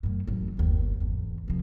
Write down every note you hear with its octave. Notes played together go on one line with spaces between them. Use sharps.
F#2 A2
A1 F#2
G1 D#2
G#1 E2
C2 F3